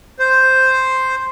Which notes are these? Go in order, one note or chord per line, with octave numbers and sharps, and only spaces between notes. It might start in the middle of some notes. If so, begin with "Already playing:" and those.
C5